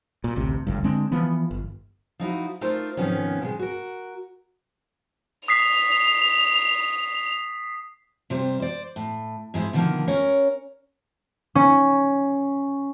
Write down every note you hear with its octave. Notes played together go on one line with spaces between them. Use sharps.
A#2
A1 D2 C3
G1 C#2 G2
D3 G#3 C4 D4
E3 F3 B3
G1
F3 D#4 E4 F#4
A3 D#4 F4 A#4 C5
G#2 C3 D#3 F3 B3 C#4
B2 D#3 G#3
F#4 A#4
D#6 B6 C7 F7
C3 G3 C5
C5 D5
A2
G#2 G#3 E4
B2 D3 D#3 F3 A#3
C#4 A#4 C#5
C#4